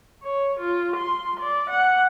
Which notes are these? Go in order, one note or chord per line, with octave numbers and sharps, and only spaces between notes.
C#5
F4
C6
D5
F#5